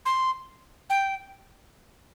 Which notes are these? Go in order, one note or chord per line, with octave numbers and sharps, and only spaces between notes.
C6
G5